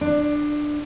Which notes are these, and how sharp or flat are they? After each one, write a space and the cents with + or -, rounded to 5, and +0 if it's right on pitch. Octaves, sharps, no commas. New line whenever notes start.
D4 +15